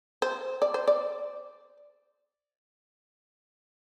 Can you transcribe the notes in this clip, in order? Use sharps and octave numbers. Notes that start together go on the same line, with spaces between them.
C5
D5
C5
D5